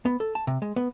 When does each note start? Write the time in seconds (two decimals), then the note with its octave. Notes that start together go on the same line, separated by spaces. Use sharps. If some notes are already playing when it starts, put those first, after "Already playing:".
0.05 B3
0.20 A4
0.35 A5
0.47 C3
0.62 G#3
0.76 B3